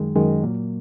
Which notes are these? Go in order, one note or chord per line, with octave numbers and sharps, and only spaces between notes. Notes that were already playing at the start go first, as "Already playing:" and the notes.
Already playing: F#2 D#3 G#3
F#2 D#3 G#3
A#2 F#3 A#3